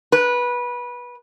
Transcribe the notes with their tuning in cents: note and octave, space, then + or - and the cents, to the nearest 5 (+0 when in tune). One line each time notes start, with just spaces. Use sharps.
B4 -20